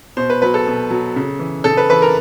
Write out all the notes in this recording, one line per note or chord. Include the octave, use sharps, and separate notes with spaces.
B2 C5
B4
F#3 B4
A4
B2
F#3
C#3
E3
C#3 A4
B4
E3 B4
A#4